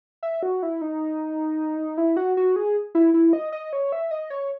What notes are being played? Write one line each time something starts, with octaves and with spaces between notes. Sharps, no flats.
E5
F#4
E4
D#4
E4
F#4
F#4
G#4
E4
E4
D#5
D#5
C#5
E5
D#5
C#5